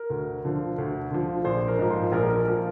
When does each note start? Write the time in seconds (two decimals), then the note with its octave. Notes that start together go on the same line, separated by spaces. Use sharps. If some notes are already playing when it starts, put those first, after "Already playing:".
Already playing: A#4
0.10 D2
0.45 D3 F3
0.78 D2
1.11 D3 F3
1.45 A#1 C5
1.68 A#4
1.79 G#2 F3
1.90 C5
2.12 A#1 A#4
2.29 A#4
2.45 F3 A#4